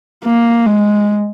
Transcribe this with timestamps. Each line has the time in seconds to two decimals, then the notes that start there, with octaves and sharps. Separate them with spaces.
0.24 A#3
0.66 G#3